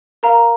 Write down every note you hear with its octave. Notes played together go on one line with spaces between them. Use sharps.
A#4 F5 A#5